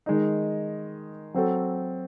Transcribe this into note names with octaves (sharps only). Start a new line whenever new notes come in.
D#3 G#3 D#4
F#3 C4 F#4 A4